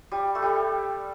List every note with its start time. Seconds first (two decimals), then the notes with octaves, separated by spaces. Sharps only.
0.12 G3
0.35 A3
0.42 G3